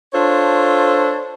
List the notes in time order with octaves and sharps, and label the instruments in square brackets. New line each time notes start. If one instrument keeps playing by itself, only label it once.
[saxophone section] D4 F4 A4 C5 C#5